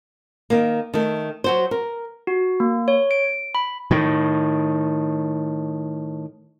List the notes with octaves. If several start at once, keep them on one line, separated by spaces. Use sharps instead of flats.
D#3 A#3
D#3 A3
F#3 F#4 C5
A#4
F#4
A#3
C#5
D7
B5
A2 D#3